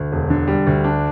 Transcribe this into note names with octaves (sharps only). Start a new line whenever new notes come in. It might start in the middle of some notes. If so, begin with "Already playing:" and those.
Already playing: D2
E1
D3
G3
D2
D4